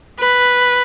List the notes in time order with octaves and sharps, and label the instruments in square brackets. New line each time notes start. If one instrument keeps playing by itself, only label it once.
[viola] B4